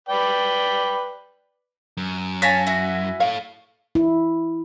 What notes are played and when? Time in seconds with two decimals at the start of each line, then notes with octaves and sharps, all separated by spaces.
0.09 B4 D5 G5
1.97 F#2
2.42 C#5 F5 G#5 A5 A#6 B6
2.67 E4 F#4
3.20 A4 C#5 F5
3.95 E4